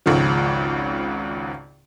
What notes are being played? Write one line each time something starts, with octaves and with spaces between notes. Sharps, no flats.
G#1 C#2 G#2 C#3 F3